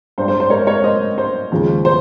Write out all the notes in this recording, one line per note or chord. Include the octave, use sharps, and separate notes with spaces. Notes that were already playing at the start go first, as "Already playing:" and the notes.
G2 G3 C5
C5
C5
A#4 C#5
A#4 C#5
C5 D#5
C5
D#2 C#3 F3 G#3
C5